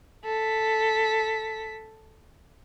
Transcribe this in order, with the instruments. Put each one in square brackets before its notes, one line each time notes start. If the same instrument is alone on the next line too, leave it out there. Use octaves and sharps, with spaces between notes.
[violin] A4 B6